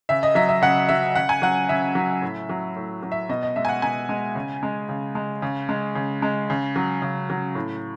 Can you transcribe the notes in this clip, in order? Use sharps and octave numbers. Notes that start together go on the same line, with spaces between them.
C#3 E5
D#5
F#3 E5
E5
C#3 F#5
F#3 E5
C#3 F#5
G#5
F#3 F#5
C#3 E5
F#3
A2
F#3
A2
F#3
E5
B2 D#5
D#5
G#3 E5
G#5
F#5
B2 G#5
G#3
C#3
G#3
C#3
G#3
C#3
G#3
C#3
G#3
C#3
F#3
C#3
F#3
A2